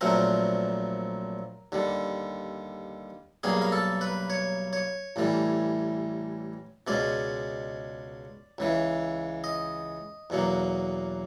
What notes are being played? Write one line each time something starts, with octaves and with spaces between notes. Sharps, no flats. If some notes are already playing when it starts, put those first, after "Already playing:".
A#1 A#2 F#3 A3 C4 A#4
D#2 D3 G3
B1 B2 G3 A#3 G#4
A#4
A4
B4
C#5
C#5
A1 A2 E3 G3
C#2 B2 G#3 C#4 D5
C#2 C#3 E3
D#5
E2 B2 F#3 A#3